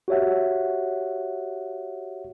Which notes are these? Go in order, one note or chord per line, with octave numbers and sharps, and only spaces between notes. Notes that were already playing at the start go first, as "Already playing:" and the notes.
F#4 G4 C#5 E5 F#5